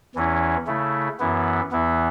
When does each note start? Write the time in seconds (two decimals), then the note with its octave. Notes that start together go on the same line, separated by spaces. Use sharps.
0.15 E2 E3 C#4 E4
0.67 C#3 A3 E4
1.20 F#2 E3 B3 E4
1.72 E2 E3 B3 E4